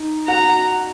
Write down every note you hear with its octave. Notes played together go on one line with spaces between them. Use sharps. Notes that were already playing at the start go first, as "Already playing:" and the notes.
Already playing: D#4
F#4 F#5 A#5